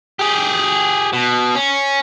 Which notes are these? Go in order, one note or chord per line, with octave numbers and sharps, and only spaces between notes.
G4 G#4
B2
C#4